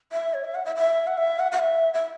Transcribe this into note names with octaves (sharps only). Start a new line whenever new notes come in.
E5
C#5
E5
F#5
E5
E5
F#5
E5
F#5
F#5
E5
E5